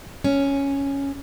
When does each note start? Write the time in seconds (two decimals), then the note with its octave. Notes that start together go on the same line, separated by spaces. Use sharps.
0.24 C#4